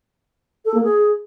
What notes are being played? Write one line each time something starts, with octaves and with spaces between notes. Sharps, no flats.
A4
A#3
G#4